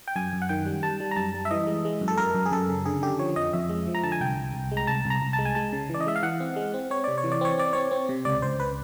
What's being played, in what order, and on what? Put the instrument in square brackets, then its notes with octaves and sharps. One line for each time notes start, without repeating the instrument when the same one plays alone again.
[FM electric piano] G5
F#2 G#5
F#2
F#5
D#3 G5
G3
G3 A5
G3
A#5
F#2 A5
G3
E5
E3 D#5
G#3
G#3
F#2
A4
F#2 A#4
F#2
G#4
F#2 A4
C#3
D3 G#4
D3 G4
F3 C#5
F2 D#5
F2 E5
G#3
F3
A#5
D3 A5
G#5
C2 G5
C2
C2
G#3
A#5
C2 A5
C2 A#5
C2
A5
G#3
G#5
G#3 A5
C#3
E3
D5
D#5
G#3 E5
F5
E3 F#5
C4
G#3
C4
C4 C#5
C3 D5
C#5
E3
D5
C4 C#5
C4 D5
C4 C#5
C4
C3
C#2 D5
C#2 C5
C#2 B4